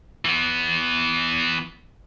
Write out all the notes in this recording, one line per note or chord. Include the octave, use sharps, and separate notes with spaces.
E3 B3